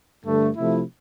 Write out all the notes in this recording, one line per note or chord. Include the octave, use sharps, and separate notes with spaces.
G2 D3 A3
C3 F3 A3 E4